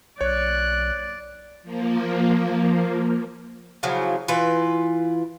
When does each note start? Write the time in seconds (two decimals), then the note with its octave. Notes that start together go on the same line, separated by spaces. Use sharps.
0.21 B1 C#5 D5 F#6
1.63 F3 A#3
3.83 C#3 F3 F#3 E4
4.28 E3 F4 B4